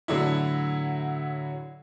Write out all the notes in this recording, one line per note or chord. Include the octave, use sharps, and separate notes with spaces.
A2 D3 F#3 E4